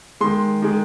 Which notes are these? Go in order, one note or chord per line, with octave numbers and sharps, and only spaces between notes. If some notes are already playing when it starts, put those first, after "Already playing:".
D#3 G#3 C6
D#3 G#3